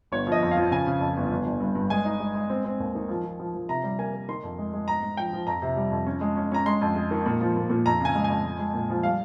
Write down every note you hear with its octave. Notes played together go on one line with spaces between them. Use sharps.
G1 C#5
F3
D#5
F2
F5
F3
C#3 G#5
C#3
F2
G1
G1
G1
G2
G2
G#3 G#5
D#4
G#3
G#3
C4
C4
D#2
D#3
F3
F3
F3
F3
C3 A#5
G3
A#3 G#5
A#3
D#3 C6
F2
G#3
G#3
G#2 A#5
G#2
F3 G5
F3
F2 A#5
C3
G3
F2
C#4
G#3
C#4
C#4 A#5
G#3 C6
F2
G#3
D#3
A#2
F3
A#2
A#2
F2 A#5
C#3 G#5
G#3
G#5
F2
G#3
G#3
A#2
F3
G3 F5